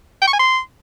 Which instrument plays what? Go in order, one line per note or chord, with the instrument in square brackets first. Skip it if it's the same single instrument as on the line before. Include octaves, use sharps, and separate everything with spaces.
[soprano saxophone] G5
C#6
G#5
C6